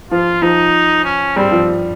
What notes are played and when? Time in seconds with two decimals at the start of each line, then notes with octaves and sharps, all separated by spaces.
0.11 F3 F4
0.42 F3 D#4
1.04 C#4
1.36 G3 C4
1.52 F3